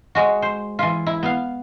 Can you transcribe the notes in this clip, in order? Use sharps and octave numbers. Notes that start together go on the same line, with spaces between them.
G#3 F#4
C5
E3 F4
E4
B3 F5